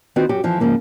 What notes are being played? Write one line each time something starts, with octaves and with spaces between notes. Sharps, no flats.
D#3 C4 F4 F#4 B4
F#2 F#4 G4
F2 E3 F3
G#2 C#3 F3 A#3